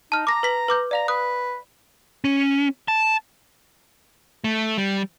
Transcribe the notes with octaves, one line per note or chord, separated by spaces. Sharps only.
D#4 A5 F6
A#5 D6 A#6
B4 B6 F#7
B4 D6 G6
D5 F5 A#5 F7
B4 D#6 F#6
C#4
A5
A3
G3